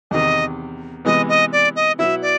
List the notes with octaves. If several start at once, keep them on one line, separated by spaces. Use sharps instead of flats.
E2 C3 D#3 D#5
C3 E3 G#3 B3 D#5
D#5
D5
D#5
B2 F#3 B3 E4 E5
D5